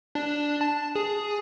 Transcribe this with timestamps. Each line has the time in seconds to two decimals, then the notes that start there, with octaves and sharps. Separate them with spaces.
0.15 D4
0.61 A5
0.95 G#4